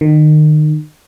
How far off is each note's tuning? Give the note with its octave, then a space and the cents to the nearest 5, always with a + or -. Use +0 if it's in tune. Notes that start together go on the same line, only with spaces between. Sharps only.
D#3 -30